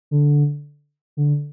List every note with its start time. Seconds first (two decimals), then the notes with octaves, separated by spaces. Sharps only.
0.11 D3
1.17 D3